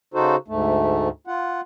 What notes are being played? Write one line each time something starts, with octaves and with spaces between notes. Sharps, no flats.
C#3 D#4 F#4 A4 C5
D2 G#2 A3
F4 F#5